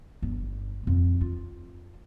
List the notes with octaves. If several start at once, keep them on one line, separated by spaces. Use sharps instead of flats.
G1
F2
F4